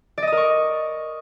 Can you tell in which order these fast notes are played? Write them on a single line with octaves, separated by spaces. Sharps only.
D5 D#5 D#6 A#4 C#6